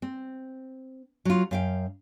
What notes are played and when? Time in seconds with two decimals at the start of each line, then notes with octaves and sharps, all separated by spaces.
0.02 C4
1.25 F#3 F4
1.51 F#2 F5 G5